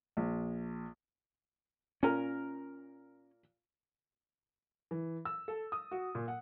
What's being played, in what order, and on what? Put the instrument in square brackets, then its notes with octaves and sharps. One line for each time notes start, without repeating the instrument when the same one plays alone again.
[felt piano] A#1
[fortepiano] A#2 A#4 [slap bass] C#4
[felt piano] E3
E6
A4
D#6
F#4
A#2
F#5